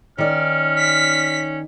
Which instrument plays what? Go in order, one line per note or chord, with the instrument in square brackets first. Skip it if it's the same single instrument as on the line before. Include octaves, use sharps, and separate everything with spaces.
[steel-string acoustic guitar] D#3 D5 [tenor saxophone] C#4 [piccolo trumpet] F6
[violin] B6